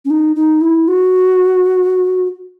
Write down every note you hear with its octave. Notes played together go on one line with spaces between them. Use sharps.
C#4
D#4
D#4
E4
F#4